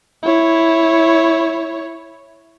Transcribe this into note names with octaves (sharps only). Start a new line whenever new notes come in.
E4 C#5